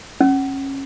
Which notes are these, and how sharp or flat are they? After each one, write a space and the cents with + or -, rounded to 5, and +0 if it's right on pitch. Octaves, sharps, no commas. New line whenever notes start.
C#4 -25